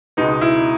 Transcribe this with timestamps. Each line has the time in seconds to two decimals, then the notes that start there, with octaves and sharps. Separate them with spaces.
0.17 C#2 B2 G#3 B3 D#4
0.41 E4